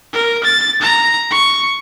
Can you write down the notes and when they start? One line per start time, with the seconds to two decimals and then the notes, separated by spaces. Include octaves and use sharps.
0.13 A#4
0.43 A6
0.81 A#5
1.31 C#6